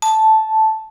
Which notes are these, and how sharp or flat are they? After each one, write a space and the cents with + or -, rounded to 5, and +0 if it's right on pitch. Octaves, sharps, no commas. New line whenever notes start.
A5 -5